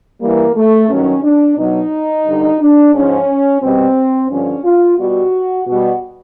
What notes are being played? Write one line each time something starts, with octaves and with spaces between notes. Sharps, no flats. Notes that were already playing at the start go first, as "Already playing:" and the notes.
G2 E3 G3 A#3
A3
G2 D#3 F#3 C#4
D4
B2 F#3 D#4
G2 D3 G3
D4
G#2 F3 C#4
B2 G3 C4
G2 D3 F3 C#4
F4
B2 G3 F#4
B2 G3 F#4